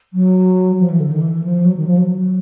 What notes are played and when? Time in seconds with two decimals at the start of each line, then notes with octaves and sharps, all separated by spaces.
0.13 F#3
0.79 F3
0.90 E3
1.00 D3
1.11 D#3
1.21 E3
1.44 F3
1.65 F#3
1.77 D#3
1.87 F3
1.97 F#3